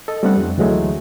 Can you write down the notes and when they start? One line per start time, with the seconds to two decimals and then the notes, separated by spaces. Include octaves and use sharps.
0.08 A4 D#5
0.23 G3 A3 B3 C4 D4 F#5
0.37 F2
0.58 D2 E3 F#3 G#3 A3